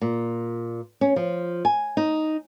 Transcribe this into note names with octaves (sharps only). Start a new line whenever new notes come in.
A#2
C#4
F3
G#5
D#4